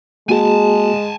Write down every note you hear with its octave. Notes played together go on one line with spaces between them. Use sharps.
G#3 A#3 F#4 G#4 G#5 A5